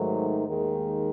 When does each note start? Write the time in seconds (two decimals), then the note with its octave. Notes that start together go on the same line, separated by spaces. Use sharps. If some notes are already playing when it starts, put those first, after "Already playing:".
Already playing: G#2 D#3 F#3 A3
0.46 D#2 D#3 G#3